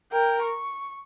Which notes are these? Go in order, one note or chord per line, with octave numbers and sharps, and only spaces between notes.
A#4 G5
C#6